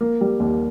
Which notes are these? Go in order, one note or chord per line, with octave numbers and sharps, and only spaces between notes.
A#3
G3
D#2